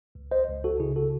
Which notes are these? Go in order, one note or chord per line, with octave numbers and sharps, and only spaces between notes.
C#2
C5 D#5
C#2
F#4 A4
C#3 E4 G#4
F#4 A4